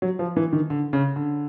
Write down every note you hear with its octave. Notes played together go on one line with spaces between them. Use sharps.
F#3
F3
E3
D#3
D3
C#3
D3